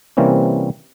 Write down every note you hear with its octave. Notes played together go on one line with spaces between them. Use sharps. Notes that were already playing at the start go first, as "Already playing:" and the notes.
C3 E3 G3 A#3 C4 C#4